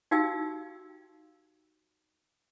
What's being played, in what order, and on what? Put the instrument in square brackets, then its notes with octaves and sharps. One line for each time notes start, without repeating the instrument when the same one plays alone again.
[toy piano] D#4 F#4 G4 F5 G5 E6